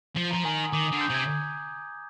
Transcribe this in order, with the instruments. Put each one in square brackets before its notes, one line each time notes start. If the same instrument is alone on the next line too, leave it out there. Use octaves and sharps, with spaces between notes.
[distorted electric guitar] F3
[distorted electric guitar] F3 [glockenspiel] A#5
[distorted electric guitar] D#3 [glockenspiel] G#5
[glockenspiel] D#6
[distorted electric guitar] D#3 [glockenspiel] D6
[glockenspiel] D#6
[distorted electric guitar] D3
[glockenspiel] G6
[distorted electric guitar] C3 [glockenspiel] G#6